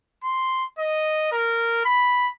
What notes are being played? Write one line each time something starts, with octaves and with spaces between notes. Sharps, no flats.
C6
D#5
A#4
B5